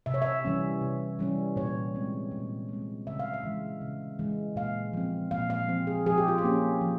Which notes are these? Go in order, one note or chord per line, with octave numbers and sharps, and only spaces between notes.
C3 E5
C#5
E5
E3 G3 C#4
C3
E3 G3 C#4
A#2 C#5
G#3 C4
A#2
G#3 C4
C#3 E5
F5
E5
E3 G#3
C#3
E3 G#3
A#2 F5
F3 C4
A#2 F5
F5
F3 C4
G#4
F3 G#4
G4
F4
G4
A#3 C#4
F3